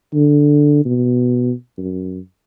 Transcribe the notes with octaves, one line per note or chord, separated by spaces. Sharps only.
D3
B2
F#2